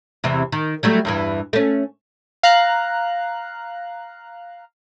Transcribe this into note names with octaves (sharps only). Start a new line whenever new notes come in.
E2 C3 E3
D#3
F#3 G3 A3
E2 G2 E3
A3 C#4
F5 A#5 F#6